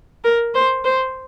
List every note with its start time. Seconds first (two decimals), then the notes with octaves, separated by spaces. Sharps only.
0.24 A#4
0.54 C5
0.85 C5